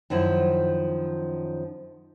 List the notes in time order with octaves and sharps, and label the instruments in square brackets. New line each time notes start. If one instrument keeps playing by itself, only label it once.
[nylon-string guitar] F#2 D#3 F3 E4